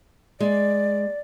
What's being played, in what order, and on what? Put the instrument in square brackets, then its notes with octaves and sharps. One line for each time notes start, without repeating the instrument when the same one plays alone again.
[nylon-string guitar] G#3 [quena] D5